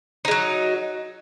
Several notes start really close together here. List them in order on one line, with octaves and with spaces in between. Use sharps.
D#4 G#3 F#3